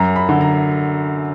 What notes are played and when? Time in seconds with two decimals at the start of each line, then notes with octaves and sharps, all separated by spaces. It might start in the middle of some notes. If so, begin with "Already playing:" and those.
Already playing: F#2 A#5
0.16 B5
0.29 D3
0.41 A#5